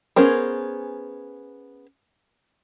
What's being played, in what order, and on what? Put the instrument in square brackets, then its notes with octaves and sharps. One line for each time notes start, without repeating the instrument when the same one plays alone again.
[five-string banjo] B3 C#4 G#4 A#4 C5